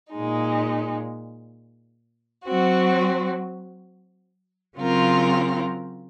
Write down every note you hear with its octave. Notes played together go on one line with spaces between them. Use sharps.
A#2 G#3 D#4
F#3 C4 F#4
C#3 F#3 C4 F4 A#4